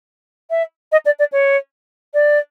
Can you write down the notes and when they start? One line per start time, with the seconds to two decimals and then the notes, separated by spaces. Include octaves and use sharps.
0.50 E5
0.92 D#5
1.05 D5
1.19 D5
1.32 C#5
2.14 D5